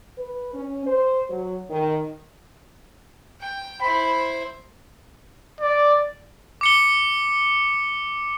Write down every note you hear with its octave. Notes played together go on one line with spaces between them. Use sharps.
B4
C#4
C5
F#3
D#3
G5
E4 C5 B5
D5
D6 C#7 G7